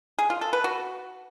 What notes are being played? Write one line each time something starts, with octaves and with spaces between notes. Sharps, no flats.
G#4
F4
A4
B4
F#4